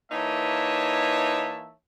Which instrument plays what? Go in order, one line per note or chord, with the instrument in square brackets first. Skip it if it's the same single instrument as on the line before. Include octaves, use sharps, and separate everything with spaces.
[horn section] E3 A#3 D#4 C#5 E5 A5